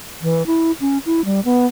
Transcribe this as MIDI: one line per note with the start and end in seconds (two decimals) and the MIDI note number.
0.22 0.46 52
0.46 0.72 64
0.81 0.98 61
1.06 1.25 64
1.25 1.40 55
1.45 1.66 59